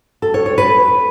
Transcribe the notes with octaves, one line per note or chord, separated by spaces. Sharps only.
A4
C#5
C#5
B4